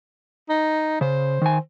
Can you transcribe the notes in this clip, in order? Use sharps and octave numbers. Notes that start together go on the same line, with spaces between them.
D#4
C#3 C5
D#3 G#5